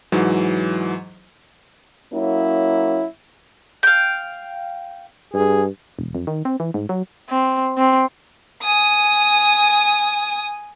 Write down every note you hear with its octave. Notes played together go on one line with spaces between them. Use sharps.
G#2 E3 F#3
F#3 A#3 C#4 E4
F5 G5
G2 G#4
E1
F2
D#3
C4
E3
G#2
F#3
C4
C4
G#5 D#6